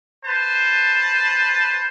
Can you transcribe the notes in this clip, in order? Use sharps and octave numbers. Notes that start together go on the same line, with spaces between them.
B4 C5 A5